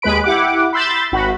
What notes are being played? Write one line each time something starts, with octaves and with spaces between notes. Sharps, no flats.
D#2 G#3 B4 B5 D7
E4 G4 F#5 D6
B5 C6 E6 G6 A6
G#1 F#4 B5